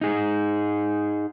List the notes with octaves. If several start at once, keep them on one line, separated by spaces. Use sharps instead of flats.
D#4 G#4